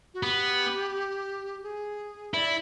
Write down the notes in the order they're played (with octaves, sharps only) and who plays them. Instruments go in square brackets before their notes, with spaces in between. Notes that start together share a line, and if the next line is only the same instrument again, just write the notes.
[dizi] F#4
[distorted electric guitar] B3 [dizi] G4
[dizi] G#4
[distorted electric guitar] E4 [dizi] D5